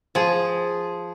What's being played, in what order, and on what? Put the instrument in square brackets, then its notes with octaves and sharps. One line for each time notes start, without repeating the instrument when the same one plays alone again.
[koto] F3 G#4